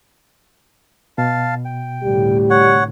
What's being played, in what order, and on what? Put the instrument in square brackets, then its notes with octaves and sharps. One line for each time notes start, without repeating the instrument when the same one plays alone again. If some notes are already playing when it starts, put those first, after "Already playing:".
[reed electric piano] B2 [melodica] F5 A5
[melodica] G5
[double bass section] D2 A2 C3 [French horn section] G3 G4
[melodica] C#5 F#5